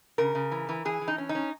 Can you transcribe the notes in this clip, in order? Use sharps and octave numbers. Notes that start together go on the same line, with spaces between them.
C#3 A#4
C#3
E3
E3
E3 G#4
E3
D#4
C#4
D#4
C#4